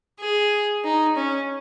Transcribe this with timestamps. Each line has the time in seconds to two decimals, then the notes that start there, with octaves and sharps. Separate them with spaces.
0.20 G#4
0.84 D#4
1.16 C#4